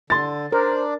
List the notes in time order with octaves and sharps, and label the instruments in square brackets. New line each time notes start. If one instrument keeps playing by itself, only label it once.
[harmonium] D3 [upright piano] C6 A6
[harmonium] D4 D5 [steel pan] A#4 [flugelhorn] C5